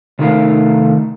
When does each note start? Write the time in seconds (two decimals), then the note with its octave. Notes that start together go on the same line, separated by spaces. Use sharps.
0.19 C3 D#3 A3 D#4 A#4 F5